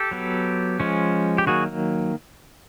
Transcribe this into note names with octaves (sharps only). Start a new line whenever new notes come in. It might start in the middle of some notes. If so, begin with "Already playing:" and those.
Already playing: G4 A4
F#3 B3
F3 G#3 C#4
G4
D#3 F#3 A#3 F#4 G#4